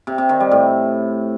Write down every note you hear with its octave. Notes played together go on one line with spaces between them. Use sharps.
C3
C3
D#3
G3
A2